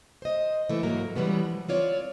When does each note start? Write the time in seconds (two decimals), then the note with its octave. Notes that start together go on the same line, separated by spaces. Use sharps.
0.22 C5 D#5
0.69 E3 A3
0.83 G#2 F#3 A#3 A#4
1.15 E3 G3 G#3 B3 C#4
1.45 F3
1.68 C4 F4 C#5 D5